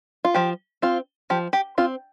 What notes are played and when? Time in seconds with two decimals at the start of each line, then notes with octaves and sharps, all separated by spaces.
0.25 F4
0.34 F3 G4
0.82 C4 F4
1.30 F3 G4
1.53 G4
1.78 C4 F4